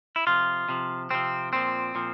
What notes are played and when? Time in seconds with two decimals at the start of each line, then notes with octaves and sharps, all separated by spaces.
0.16 E4
0.27 C3 F3 F4
0.69 C3 F3
1.11 C3 F3 C4
1.53 A#2 F3 C4
1.95 A#2 F3